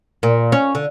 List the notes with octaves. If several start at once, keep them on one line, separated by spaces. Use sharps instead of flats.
A#2
C#4
D3